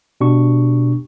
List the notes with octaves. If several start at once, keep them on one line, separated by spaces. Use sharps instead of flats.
B2 D4 G4 C#6